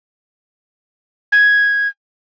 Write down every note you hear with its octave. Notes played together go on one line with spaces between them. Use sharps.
G#6